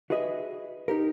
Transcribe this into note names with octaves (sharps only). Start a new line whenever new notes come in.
F#4 G#4 B4 D#5 E5
D#4 G4 A#4